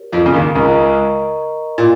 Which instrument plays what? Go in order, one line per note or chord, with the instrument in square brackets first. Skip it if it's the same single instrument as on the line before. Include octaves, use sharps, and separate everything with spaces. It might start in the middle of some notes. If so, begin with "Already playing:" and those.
Already playing: [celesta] G4 A#4 C#5
[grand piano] F2 F3
C#3
D#2 D#3
[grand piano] C#2 C#3 [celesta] A#4 D#5 A#5 C#6
[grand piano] A#2